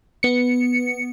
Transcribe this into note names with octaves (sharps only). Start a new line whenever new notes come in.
B3 C#7